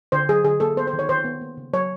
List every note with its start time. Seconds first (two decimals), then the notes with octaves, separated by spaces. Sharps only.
0.12 D3 C5
0.29 F#3 G#4
0.44 D3 G#4
0.60 A#3 A4
0.77 B3 C5
0.87 C5
0.93 D#3
0.99 C#5
1.09 D#3 C5
1.24 B3
1.41 A#3
1.57 C#3
1.73 F#3 C#5